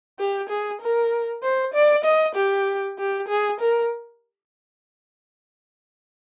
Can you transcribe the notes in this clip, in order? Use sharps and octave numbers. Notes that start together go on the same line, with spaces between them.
G4
G#4
A#4
C5
D5
D#5
G4
G4
G#4
A#4